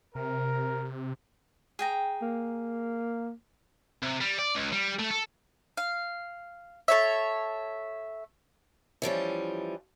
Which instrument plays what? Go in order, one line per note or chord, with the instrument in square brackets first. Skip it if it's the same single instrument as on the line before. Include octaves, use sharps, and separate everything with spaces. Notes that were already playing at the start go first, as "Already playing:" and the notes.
[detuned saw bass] C3 [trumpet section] A#4
[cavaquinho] G#4 G5 A#5
[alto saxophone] A#3
[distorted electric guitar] C3
G3
D5
C#2
G3
A3
A4
[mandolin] F5
A4 C#5 E5
[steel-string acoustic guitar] E3 F3 G3 C#4